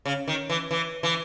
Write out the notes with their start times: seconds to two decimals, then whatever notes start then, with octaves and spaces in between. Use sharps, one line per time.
0.05 C#3
0.28 D#3
0.50 E3
0.71 E3
1.03 E3